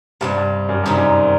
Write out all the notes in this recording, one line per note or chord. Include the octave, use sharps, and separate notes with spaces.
G2 C3 D#3 G3
G2
F#2
G2 C3 D#3 G3
F#2